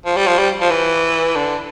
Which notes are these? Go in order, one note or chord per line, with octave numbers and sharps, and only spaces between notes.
F3
G3
F3
G3
F3
E3
D3